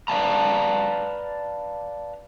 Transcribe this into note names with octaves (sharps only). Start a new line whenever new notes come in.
B4 D5 F5 A5 A#5